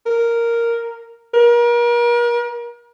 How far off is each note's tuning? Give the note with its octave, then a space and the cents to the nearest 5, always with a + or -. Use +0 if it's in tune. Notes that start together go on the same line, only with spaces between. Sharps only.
A#4 -5
A#4 +40